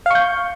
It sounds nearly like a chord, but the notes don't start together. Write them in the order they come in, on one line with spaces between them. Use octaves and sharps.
F5 C#6 G6